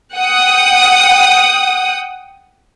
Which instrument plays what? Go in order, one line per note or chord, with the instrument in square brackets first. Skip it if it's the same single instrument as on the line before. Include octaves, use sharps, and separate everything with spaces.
[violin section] F#5 G5 D#6